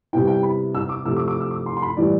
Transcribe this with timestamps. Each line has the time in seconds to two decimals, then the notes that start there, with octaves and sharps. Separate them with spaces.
0.13 C3 G3 B3 E4 G5
0.28 G5
0.43 B5
0.75 E6
0.89 D6
1.05 C3 F3 A3 E6
1.17 D6
1.28 D6
1.40 E6
1.51 D6
1.66 C6
1.77 C6
1.82 B5
1.97 A2 E3 G3 D5